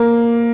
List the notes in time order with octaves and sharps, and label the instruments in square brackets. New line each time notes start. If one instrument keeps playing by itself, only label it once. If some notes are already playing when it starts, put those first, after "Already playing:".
Already playing: [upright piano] A#3